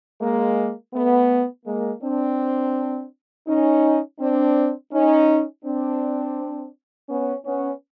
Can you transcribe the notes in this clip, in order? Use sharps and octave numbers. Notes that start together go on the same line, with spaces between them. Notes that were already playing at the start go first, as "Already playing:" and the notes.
G#3 A#3
A3 B3
G#3 A#3
C4 D4
C#4 D#4
C4 D4
C#4 D#4
C4 D4
B3 C#4
B3 C#4